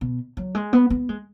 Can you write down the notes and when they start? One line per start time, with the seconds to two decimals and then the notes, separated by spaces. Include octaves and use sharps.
0.01 B2
0.37 F#3
0.55 G#3
0.73 B3
0.90 B3
1.09 G#3